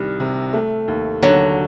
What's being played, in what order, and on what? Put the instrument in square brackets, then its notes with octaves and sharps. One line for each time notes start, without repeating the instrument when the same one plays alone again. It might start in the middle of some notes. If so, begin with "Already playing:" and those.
Already playing: [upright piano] C2 D#3 G3
C3
A3
D#2
[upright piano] D#2 [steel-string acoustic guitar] D3 F#3